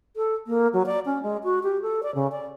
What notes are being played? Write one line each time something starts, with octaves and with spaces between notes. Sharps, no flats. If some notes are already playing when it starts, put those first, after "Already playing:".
A4
A#3
F#3
D5
C#4
G#3
F#4
G4
A4
D5
C#3
D5